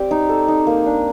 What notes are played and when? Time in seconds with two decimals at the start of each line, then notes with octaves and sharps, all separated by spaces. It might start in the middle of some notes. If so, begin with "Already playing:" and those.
Already playing: C4 G4 D5
0.11 D#4
0.29 A4
0.48 D#4
0.67 A#3
0.86 D4